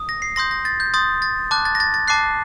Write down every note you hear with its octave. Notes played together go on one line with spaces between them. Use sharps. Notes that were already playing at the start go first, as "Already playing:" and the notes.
Already playing: D#6
A#6
C7
C6 D#6 G6 A#6
A#6
A6
G6
C6 D#6 G6 A6
A6
A5 D6 F#6
A6
A#6
A6
A6
A5 D6 F#6 C7